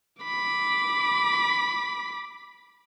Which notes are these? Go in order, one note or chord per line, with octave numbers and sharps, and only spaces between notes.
B5 D6